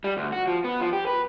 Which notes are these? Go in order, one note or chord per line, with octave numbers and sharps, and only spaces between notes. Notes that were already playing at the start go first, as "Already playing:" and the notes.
G3
D2
F#4
F3
B3
F3
G4
B4